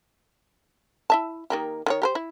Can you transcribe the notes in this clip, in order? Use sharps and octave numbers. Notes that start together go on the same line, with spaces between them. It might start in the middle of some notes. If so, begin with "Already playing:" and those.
E4 E5 A5
D#3 A#3 G4
D#3 F#4 C#5
G4 A#4 C5
E4